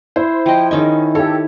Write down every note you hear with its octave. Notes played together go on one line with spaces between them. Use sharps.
E4 C5
F3 D#5 G5
D#3 C#4 G#4 D#5 C#6
G4 A4 C#5